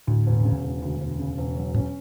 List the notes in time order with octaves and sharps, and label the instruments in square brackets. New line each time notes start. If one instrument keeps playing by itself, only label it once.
[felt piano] D2 [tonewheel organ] A2
[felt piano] E1
C#3
E1
D2
E1
C#3
E1
F#3
[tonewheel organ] A2 [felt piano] C#4